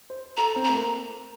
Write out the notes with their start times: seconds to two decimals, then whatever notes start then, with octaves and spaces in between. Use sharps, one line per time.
0.10 C5
0.37 A4 A#5
0.56 C4
0.65 A#5
0.69 A3
0.74 A#3